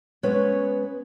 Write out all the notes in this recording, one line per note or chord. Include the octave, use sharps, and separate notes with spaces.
G#3 B3 C#4 B4 C#5